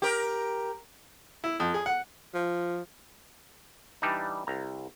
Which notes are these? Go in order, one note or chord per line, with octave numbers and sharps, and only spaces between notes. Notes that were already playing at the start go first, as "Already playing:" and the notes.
G4 A#4
E4
F2
G#4
F#5
F3
E3 G3 D4 D#4
C2 A#5